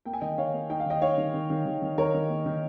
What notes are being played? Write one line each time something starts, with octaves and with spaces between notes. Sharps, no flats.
A#3 G5
G#5
D#3 D#5 G5
D#3 C#5 F5
A#3
D#4 G5
F5
D#3 D#5 G5
D#4 C#5 F5
D#3
D#3
D#3
D#3
D#3
D#3 A#4 C#5
D#3
A#3
D#3